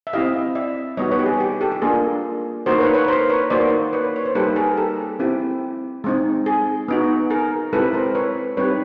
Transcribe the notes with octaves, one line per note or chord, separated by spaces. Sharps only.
E5
C4 E4 G4 D#5 F5
D5 E5
G3 B3 D#4 F#4 C#5 D#5
B4 C#5
G4
G#4
G4
G4 A4
G4
A#3 D4 F4 G#4
A#3 D#4 F#4 A#4 C5
B4 C#5
B4 C#5
A#4 C5
B4 C#5
A#3 D#4 F#4 C5 D5
B4 C#5
C#5
C5
G3 A#3 D#4 G4 A4 B4
G#4 A#4
G4 A4
C4 E4 G4
G#3 C4 D#4
G#4
B3 D#4 F#4
G#4 A#4
G#3 C4 E4 G4 A4 B4
A#4 C5
B4 C#5
G3 C4 D#4 G4 B4 C#5